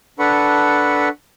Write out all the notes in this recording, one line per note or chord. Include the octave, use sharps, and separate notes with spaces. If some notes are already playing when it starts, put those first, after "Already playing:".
D4 A4 B4 F#5 B5 C#6